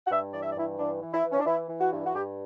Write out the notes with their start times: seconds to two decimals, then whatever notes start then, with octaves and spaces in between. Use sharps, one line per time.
0.07 F#5
0.11 G2 E5
0.34 E3 D5
0.41 E5
0.49 D5
0.56 G2 E4
0.78 E3 D4
1.01 E3
1.13 E4
1.24 E3
1.32 C#4
1.39 D4
1.46 E3 E4
1.69 E3
1.80 F#4
1.91 G2
2.05 F#4
2.14 G2 G4